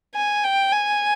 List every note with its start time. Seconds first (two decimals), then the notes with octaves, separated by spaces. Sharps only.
0.15 G#5
0.44 G5
0.72 G#5